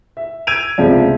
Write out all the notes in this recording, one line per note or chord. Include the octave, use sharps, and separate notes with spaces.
E5
E6 G#6 D7 D#7 F7
G1 C#2 C3 F3 G3